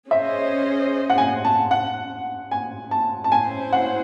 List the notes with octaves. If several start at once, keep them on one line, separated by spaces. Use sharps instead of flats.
C#4 G#4 C5 D#5 E5
F#5
G#5
A5
F#5
G#5
A5
A5
C#4 E4 C5 G#5
F#5